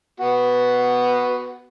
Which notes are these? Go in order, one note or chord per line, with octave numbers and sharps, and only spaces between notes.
B3 F#4